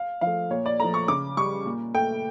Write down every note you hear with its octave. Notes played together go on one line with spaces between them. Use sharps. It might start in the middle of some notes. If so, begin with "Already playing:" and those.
Already playing: F5
F3 F5
A3
A#2 C#5
D5
F3 A3 A#5
C#6
C#3 D6
G3 C#6
A#2
A3 G5